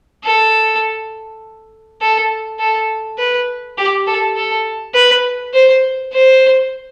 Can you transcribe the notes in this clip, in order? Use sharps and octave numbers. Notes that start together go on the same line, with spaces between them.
A4
A4
A4
B4
G4
A4
A4
B4
C5
C5